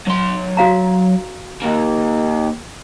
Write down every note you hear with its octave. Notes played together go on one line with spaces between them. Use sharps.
F#3 C6
F#4 F5 A#5
D#2 A#3